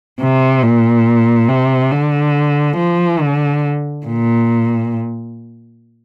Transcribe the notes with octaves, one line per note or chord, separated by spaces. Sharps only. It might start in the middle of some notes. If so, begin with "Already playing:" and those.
C3
A#2
C3
D3
F3
D3
A#2